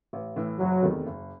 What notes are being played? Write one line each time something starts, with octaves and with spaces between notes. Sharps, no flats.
A1
A2 E3
F#1 F#3
E2 C3 D#3 A3
F#1